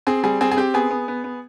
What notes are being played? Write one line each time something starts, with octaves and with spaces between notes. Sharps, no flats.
C4 G#4
G3 G#4
C4 G#4
G#4
C4 G4
B3 G#4
B3
B3
B3